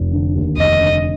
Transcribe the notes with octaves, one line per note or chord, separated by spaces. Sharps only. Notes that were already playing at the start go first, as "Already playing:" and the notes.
Already playing: F1
D3
D#2
F1 D#5
D3